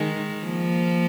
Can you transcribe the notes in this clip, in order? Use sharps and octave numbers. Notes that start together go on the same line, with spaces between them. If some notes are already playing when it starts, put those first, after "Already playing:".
Already playing: D#3 G#3
F3 A#3